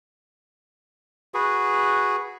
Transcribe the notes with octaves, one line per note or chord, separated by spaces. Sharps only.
F#4 G#4 B4